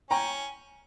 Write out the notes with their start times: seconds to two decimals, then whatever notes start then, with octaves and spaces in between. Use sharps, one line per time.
0.10 C#4 G5 A#5